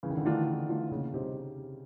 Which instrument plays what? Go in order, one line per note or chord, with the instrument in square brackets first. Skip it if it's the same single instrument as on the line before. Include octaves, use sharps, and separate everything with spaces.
[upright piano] C#3 [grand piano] E3
[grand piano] D#3
D3
[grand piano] D#3 [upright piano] E3 A3 D4 F4
[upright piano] C#3
E3 A3 D4 F4
[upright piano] A#2 [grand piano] C#3
[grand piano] C3 [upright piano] G3 C4 D#4 G4